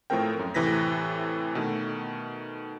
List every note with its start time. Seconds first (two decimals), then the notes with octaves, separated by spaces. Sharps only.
0.10 A2 F3 A3 C4 A#4 G5
0.39 F#2
0.54 A2 C3 E3 B4 A#6 B6
1.55 B2 D#3 A3